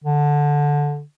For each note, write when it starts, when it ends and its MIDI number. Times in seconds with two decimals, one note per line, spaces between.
0.04 1.02 50